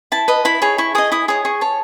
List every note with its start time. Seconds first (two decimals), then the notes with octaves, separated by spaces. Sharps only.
0.12 E4 A5
0.28 B4 D#5
0.45 E4 B5
0.62 G#4 C#5
0.78 E4 C#6
0.95 G#4 D#5 D#6
1.12 E4 D#6
1.28 G#4 C#5 D#6
1.45 G#4 C#6
1.61 C#5 A5